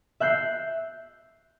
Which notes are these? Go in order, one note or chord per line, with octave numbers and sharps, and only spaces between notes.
E5 F#6 G6 C7